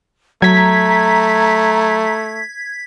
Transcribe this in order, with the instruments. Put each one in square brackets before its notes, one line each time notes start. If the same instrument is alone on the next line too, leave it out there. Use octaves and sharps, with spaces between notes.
[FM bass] F#3 [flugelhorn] A3 [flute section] A#5 [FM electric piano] G#6 B6